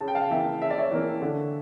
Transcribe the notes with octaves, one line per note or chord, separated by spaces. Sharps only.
C#3 A5
G5
F5 A5
E3 A#3 E5 G5
C#3 E5
D5
C#5 E5
E3 A#3
D3